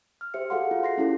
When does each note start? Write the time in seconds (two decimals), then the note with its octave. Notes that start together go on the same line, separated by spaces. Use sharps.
0.21 F6
0.34 G4 C5 E5 C#7
0.50 F#4 G#4 A4 F5 F#5 C6
0.71 F4
0.83 C6 A#6 C7
0.97 C#4 E4 G4 A4